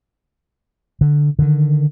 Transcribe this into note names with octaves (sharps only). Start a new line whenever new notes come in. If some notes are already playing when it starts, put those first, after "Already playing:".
D3
D3 D#3